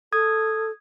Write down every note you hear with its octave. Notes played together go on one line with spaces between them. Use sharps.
A4 D#6 G#6